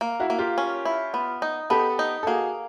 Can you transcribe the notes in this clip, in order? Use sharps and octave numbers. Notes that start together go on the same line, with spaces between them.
A#3
E4 F#4
A#3
F4 G4
C#4
E4
B3
D#4
B3 G4 A4
D#4
A4
A#3 F#4 G#4